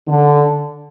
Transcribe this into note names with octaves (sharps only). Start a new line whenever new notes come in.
D3